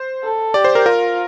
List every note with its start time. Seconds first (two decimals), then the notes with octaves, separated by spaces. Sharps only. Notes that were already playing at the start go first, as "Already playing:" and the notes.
Already playing: C5
0.24 A4
0.54 G4 D5
0.65 C5
0.75 A#4
0.86 F4 A#4